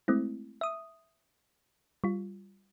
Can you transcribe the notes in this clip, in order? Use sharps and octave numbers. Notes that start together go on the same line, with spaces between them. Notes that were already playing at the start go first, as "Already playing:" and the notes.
G#3 A3 C4 E4
E5 D#6
G3 F4